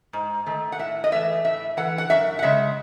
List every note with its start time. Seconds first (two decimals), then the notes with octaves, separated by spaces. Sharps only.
0.13 G#2
0.46 D#3 A3
0.72 F#5
0.79 A2 E5
1.04 D#5
1.12 E3 A3 E5
1.44 A2 E5
1.77 E3 A3 F#5
1.98 F#5
2.10 F#2 E5
2.39 F#5
2.43 C#3 G#3 E5